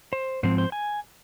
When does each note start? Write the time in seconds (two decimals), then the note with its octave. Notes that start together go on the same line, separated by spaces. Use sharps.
0.13 C5
0.43 G#2 F3 C4 C5
0.58 C5
0.72 G#5